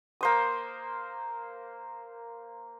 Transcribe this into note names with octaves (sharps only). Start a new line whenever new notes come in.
A#3 C5 D#6